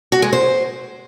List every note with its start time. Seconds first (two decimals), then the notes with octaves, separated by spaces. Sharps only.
0.12 F#4
0.22 G#3
0.33 C5